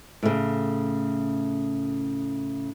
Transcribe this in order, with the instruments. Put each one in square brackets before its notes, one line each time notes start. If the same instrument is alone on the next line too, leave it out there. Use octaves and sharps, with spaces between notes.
[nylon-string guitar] A2 C#3